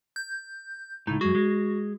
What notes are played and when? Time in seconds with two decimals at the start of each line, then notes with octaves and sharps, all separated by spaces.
0.16 G6
1.07 C#2 A2 D#4
1.21 F#2 G#3 F#4
1.35 G#3